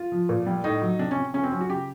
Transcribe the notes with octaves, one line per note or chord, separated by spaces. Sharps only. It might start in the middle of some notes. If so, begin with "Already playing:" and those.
Already playing: F4
F3
A#2
G3
A2 D#4
F#3
C3 D4
C#4
C3
C#3 C#4
C4
F#3 C#4
F#4
C#3 G4